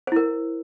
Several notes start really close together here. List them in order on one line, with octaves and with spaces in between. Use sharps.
C5 E4 A#4